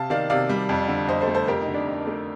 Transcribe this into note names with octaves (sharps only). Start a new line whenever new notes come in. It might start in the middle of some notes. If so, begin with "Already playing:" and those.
Already playing: C3 F5 A5
D#3 D5 F5
C3 D5 F5
G3
F2
D3
F2 C5 D#5
A4 C5
A3
A4 C5
F2 G4 A#4
D#4
D3
D4
F2
A3